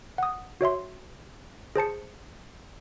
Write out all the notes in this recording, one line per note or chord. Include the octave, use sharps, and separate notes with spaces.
F#5 D#6
F#4 C#5 E5 C6
G#4 C5 A5 C#7